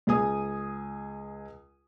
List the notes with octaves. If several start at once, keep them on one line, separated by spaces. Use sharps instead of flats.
C#2 G#4 G#5 D#6